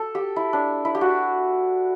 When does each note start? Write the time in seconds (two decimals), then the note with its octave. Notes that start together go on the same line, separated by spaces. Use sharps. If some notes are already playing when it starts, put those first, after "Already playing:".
Already playing: A4
0.15 G4
0.36 E4
0.53 D4
0.85 E4
0.95 G4
1.01 F#4